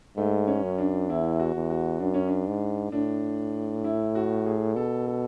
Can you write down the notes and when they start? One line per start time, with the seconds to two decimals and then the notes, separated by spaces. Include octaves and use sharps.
0.17 G#2 A3
0.47 C#4
0.63 F#2
0.78 D4
1.09 E2 E4
1.39 F#4
1.55 E2
1.70 F#4
2.00 F#2 D4
2.14 C#4
2.27 D4
2.47 G#2
2.92 A2 D4
3.84 E4
4.15 F#4
4.46 G#4
4.75 B2 A4
5.07 A4